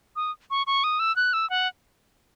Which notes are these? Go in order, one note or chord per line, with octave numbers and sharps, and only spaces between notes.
D#6
C#6
C#6
D#6
E6
F#6
E6
F#5